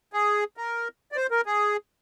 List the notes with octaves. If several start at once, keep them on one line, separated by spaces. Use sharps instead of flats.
G#4
A#4
D5
C5
A#4
G#4